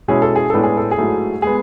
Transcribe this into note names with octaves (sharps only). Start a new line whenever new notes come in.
B2 G#3 C#4 E4 G#4
A4
G#4
A2 G#3 B3 D4 A4
G#4
A4
G#4
G#2 F#3 A3 E4
G#3 B3 G#4